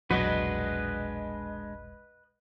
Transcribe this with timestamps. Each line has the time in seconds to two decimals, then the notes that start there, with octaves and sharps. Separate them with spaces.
0.11 E1 A#1 F#3 G#3 D4 F#4 B4 D#5